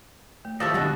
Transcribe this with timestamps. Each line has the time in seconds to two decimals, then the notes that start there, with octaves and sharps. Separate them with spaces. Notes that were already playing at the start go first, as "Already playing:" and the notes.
0.45 A3
0.60 D#3 F3 A3 E4 F4 G4 D#5 A5
0.74 B2 D3 G3 F#4